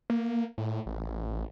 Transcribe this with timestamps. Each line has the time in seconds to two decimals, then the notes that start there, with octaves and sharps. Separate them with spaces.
0.10 A#3
0.58 A2
0.86 A1